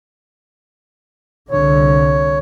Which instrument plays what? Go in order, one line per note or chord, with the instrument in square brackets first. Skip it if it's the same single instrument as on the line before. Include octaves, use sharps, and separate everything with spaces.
[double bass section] C2 D3 [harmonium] C#5